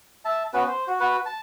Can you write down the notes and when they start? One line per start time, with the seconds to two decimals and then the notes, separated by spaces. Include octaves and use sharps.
0.25 E5 A5
0.54 B3 C#4 F#4 B4
0.68 C5
0.87 F#4
1.00 F#4 B4
1.26 A5